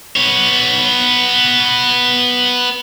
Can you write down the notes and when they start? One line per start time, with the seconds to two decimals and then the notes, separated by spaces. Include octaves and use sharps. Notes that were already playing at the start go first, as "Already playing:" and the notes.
0.16 B3 C#5